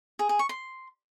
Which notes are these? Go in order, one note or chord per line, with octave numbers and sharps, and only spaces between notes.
G#4
G#4
C#6
C6